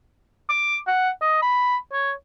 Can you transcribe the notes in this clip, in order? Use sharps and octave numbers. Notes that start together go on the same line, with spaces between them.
D6
F#5
D#5
B5
C#5